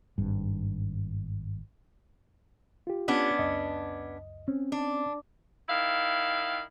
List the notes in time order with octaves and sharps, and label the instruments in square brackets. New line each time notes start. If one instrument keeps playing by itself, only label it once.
[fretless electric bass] G#1 G2
[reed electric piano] F4 G4
[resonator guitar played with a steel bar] B3 C#4 D4
[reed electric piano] C#2 F#2 D#5
C4 C#4
[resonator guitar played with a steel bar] D4
[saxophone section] D#3 E4 F5